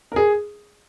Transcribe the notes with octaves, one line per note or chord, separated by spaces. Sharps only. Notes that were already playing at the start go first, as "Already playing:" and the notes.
A#4
G#4